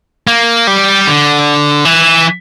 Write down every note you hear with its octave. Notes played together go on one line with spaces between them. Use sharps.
A#3
G3
D3
E3